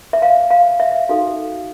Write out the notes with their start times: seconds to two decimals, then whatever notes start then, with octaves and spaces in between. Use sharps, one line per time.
0.13 E5
0.22 F5
0.51 F5
0.80 E5
1.09 D#4 F#4 A4 F5